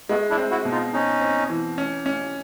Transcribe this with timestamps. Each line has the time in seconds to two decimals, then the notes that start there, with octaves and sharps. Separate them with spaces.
0.09 G#3 A3 B3
0.30 D4 E4
0.37 C4
0.51 E4 F#4
0.65 B2
0.72 D#4 F4
0.93 C4 C#4 D#4
1.21 C4
1.50 E3
1.78 C#4
2.06 C#4